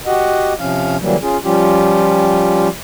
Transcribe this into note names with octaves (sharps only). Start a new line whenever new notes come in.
F#4 G4 D#5 F#5
C3 F3 C#4 F5
D3 E3 F#3 G3 A#3
C#4 F4 G#4
F3 G3 C#4 F4 G4